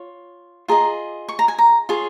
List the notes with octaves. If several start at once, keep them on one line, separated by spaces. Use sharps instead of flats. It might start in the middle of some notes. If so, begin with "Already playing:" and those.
Already playing: F4 C#5
F4 G#4 D#5 A#5
C#6
A#5
G#5
A#5
F4 G#4 C#5